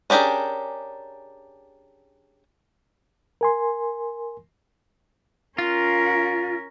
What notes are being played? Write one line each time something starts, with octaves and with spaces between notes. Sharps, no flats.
C#4 D4 G4 G#4 A#4
A#4 G#5 C6
C#4 F4 A#4